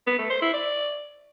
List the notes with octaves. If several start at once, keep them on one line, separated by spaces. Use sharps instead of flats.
B3
A3
C5
E4
D5